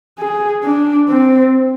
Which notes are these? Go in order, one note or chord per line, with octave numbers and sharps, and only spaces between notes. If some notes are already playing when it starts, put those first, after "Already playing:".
G#4
D4
C4